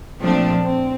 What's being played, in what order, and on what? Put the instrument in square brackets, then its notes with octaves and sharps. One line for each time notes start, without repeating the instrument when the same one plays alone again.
[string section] A#2 F3 A3 D4 [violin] C4
[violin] C4